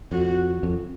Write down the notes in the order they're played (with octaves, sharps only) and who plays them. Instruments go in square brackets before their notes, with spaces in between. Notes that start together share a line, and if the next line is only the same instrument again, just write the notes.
[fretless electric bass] F2 [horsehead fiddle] F#4
[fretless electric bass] F2